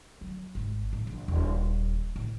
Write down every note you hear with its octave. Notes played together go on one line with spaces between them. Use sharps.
F#3
G#1
A2
A#1
D#1
A1